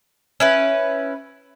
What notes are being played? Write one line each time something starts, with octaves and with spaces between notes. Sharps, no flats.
C#4 E4 B4